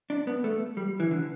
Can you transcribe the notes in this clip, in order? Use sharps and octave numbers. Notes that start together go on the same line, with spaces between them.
D4
B3
A3
G3
E3
D3